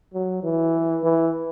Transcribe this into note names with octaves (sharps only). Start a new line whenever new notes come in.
F#3
E3
E3